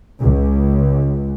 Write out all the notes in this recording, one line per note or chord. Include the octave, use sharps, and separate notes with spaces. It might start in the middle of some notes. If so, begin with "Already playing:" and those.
C#2